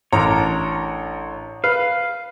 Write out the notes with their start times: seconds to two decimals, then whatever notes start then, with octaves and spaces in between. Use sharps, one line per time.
0.13 A1 D4 A#4 C#5 A#5
1.64 B4 F5